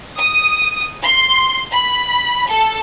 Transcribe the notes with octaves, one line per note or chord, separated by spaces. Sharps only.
D#6
C6
B5
A4